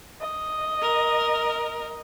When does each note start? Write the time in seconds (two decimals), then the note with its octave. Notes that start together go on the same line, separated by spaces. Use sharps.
0.21 D#5
0.82 A#4